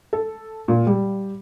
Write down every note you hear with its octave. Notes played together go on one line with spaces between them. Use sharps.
A4
A#2
G3